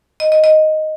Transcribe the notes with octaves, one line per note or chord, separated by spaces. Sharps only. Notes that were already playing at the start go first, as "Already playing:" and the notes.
D#5
D#5
D#5